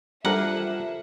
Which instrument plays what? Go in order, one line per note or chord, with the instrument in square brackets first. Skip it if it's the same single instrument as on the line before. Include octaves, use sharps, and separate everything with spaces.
[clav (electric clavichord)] G3 D4 A#4 [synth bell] F4 A4 C5 [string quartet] E5 [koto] F#5